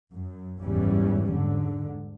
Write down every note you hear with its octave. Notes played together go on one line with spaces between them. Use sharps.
F#2
F#1 E2 G#2 E3 G3 C#4
G#2 D3